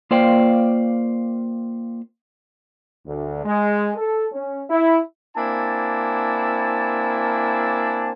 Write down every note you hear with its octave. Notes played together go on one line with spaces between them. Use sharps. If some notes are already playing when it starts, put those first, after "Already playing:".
A#3 F4 C5 D5 F5 G5
D2
G#3
A4
C#4
E4
A#3 C4 D4 E4 G#5 A5